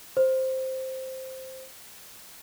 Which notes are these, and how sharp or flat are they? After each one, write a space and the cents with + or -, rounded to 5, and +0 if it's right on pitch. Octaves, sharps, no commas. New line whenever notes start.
C5 +0